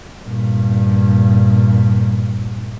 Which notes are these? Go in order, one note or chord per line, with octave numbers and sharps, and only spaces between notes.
G2 A#2